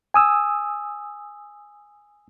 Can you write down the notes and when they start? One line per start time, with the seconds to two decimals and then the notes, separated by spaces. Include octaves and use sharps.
0.14 G#5 D#6 E6